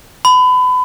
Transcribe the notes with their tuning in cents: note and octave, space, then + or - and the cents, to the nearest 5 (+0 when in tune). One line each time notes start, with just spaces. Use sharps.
B5 +30